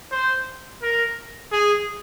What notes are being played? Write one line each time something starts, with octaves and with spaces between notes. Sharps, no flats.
C5
A#4
G#4